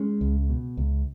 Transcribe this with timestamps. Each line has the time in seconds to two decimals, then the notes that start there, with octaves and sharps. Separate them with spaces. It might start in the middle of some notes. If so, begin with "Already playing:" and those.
Already playing: G#3 C#4
0.21 C#2
0.49 B2
0.77 C#2